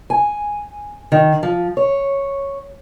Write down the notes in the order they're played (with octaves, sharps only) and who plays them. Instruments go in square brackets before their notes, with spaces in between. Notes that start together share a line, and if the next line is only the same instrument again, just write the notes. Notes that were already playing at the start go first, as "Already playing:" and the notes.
[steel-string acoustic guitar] G#5
D#3
F3
C#5